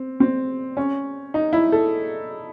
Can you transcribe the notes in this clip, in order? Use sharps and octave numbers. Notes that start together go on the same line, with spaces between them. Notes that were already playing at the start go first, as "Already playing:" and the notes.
Already playing: C4
C4
C#4
D#4
E4
A4